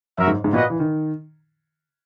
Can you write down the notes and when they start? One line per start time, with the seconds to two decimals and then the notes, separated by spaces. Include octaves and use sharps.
0.18 F#2 F#4 A#4 E5
0.27 G#2
0.44 G#2
0.52 A#2 F#4 B4 D#5 F#5
0.70 E3
0.79 D#3